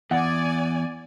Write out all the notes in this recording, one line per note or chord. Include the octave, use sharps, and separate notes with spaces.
E2 D5 F#5 G#5